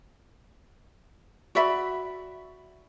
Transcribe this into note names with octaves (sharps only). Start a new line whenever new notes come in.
F#4 D5 E5 B5